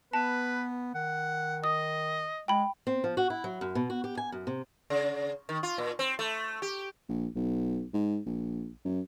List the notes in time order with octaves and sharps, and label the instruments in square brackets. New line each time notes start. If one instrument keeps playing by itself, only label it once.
[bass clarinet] B3 [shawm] B4 [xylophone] A5
[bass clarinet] D#3 [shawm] F#5
[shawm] D#5 [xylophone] D#6
[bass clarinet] G#3 [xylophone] G5 B5
[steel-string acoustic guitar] C4
F3
F#4
E4
F#3
F#2
B2
F#4
G4
G#5
F#2
C3
[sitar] C#3
D#3
F4
A#2
C4
A3
G4
[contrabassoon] A#1
B1
G#2
A#1
F#2